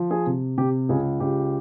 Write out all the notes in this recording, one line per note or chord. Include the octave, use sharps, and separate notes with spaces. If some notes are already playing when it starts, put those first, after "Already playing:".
Already playing: F3
G#4
C3
C3 G4
C#2 G#4
C#2 G4